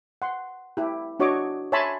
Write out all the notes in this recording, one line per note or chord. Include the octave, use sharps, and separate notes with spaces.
F#5 C6
E4 G4
D4 F#4 C#5 D#5 C#6 D6
C#5 E5 G#5 A5 B5 C6